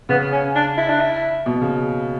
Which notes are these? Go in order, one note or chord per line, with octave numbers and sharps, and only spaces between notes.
C#3 B3
C#4
D4
E4
D4
E4
B2
C#3